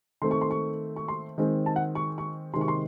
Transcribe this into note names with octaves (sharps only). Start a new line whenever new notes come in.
D#3 A3 C4 C6
C#6
C6
C#6
C#6
C6
D#3 G#3 C4
A5
F#5
C#6
C#6
C3 D#3 G#3 C4 C6
C#6
C6